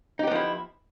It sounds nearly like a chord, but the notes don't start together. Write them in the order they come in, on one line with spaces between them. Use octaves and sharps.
D#4 G4 B3 F3 E4